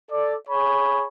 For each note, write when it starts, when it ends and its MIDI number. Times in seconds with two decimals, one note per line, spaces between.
0.11 0.36 69
0.11 0.36 74
0.48 1.06 68
0.48 1.06 73
0.48 1.06 83